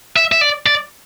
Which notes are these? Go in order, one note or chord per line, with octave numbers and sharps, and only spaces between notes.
E5
E5
D5
D5